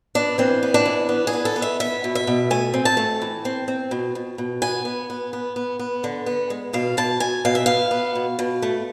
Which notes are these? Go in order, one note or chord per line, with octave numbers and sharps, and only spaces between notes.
B3 D4
E3 C4
B3
D4
E3
B3
G#4
B3
A4
B3
E5
B3 E5
B2
E5
B2
A3 G#5
C4
A5
A3
E3
C4
C4
B2
B2
B2
B3 G#5
B3
B3
B3
B3
B3
D3
B3
G#3
B2 F5
B2 A5
B2 G#5
B2 F5
E5
B3 F5
B3
B2
B2
A3